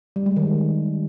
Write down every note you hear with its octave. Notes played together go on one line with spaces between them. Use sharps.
G3
G#3
D#3